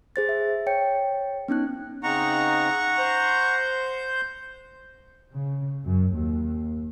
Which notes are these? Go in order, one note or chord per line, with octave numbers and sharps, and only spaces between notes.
G#4 C5 A6
E5
C#5 G5 C#7
B3 C#4 D#4 F#6
C#3 C4 D#4 F#5 A#5 C#6
C5 G6
C#3
F#2
D#2